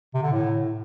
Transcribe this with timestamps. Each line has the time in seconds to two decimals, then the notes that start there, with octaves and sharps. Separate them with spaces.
0.14 C3
0.23 D3
0.32 A2